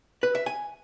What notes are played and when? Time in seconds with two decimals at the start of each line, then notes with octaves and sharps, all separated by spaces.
0.23 B4
0.35 E5
0.46 G#5